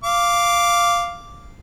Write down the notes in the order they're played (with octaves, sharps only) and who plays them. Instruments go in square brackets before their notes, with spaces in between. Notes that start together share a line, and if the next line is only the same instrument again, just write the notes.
[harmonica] F5 D6